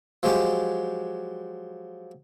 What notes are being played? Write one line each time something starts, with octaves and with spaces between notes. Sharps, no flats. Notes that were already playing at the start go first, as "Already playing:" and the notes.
F3 F#3 G#3 G4